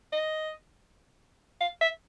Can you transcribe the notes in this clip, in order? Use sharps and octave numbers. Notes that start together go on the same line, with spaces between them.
D#5
F5
E5